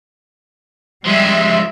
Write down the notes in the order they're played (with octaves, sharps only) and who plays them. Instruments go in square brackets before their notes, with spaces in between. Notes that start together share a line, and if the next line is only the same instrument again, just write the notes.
[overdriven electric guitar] F3 G#3 [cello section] G3 E5